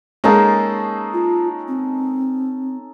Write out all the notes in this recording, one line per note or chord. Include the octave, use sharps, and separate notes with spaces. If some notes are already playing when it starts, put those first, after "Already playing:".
G#3 A#3 C#4 D#4 G#4 A4
F4
C4